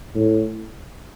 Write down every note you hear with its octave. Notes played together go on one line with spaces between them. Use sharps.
A2